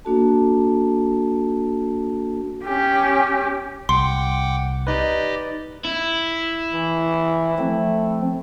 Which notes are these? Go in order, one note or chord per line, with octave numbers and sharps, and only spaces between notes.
A#3 D4 F#4 A4 A5
C#4 G4
C2 F#5 G5 C6 D6
D#4 G4 B4 D5 D#5
E4
E3
F3 A3 C4